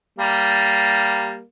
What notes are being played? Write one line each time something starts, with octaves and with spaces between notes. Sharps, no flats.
G3 A#3